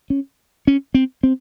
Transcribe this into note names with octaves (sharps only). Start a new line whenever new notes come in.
C#4
C#4
C4
C4